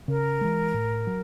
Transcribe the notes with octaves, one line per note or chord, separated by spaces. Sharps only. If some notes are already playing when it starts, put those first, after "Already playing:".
C#3 A#4
E3 G#3
A2
F#3